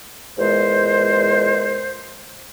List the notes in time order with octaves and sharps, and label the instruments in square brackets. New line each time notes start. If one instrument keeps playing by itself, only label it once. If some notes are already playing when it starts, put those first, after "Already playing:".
[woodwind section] E2 A#2 G#3 C5